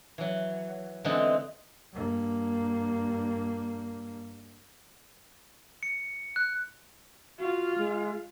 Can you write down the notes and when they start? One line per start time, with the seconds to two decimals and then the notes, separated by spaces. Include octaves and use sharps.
0.18 E3 F#3
1.05 D3 E3 G#3 B3 C4 D#4
1.94 G2 A#3
5.83 C#7
6.36 F#6
7.39 F4 F#4 F5
7.78 G#3